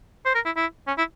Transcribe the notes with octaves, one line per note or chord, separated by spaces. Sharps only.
C5
A#4
E4
E4
C#4
E4